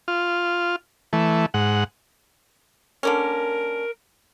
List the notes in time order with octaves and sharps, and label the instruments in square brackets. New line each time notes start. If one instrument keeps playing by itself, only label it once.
[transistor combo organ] F4
E3 A3
G#2 F#5
[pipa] D3 A#3 C#4 [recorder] A#4